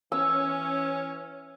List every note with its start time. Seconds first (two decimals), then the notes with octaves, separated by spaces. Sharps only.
0.12 E3 C#4 E6